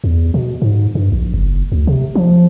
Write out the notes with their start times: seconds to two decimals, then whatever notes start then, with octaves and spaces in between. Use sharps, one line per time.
0.04 E2
0.34 B2
0.62 G#2
0.95 G2
1.12 A#1
1.34 F#1
1.72 D2
1.87 C3
2.15 F3